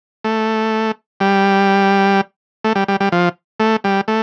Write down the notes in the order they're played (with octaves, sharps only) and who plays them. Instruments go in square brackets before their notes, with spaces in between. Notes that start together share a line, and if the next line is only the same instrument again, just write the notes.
[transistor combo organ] A3
G3
A3
G3
G3
G3
F3
A3
G3
A3